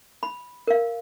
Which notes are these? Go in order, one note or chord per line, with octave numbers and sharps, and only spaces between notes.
B5
A#4 F5